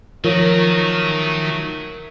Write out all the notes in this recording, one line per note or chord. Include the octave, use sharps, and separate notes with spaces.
D#3 F3 F#3 A3 F#4 A#4 C#5